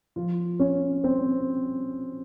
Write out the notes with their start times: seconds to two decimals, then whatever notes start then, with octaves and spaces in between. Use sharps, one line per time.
0.16 F3 F4
0.59 C#4 C#5
1.04 C4 C5